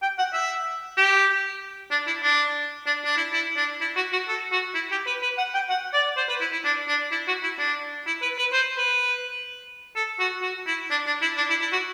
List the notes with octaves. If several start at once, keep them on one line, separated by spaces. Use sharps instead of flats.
G5
F#5
E5
G4
D4
E4
D4
D4
D4
E4
E4
D4
E4
F#4
F#4
A4
F#4
E4
G4
B4
B4
F#5
G5
F#5
D5
C5
B4
E4
E4
D4
D4
E4
F#4
E4
D4
E4
B4
B4
C5
B4
A4
F#4
F#4
E4
D4
D4
E4
D4
E4
E4
F#4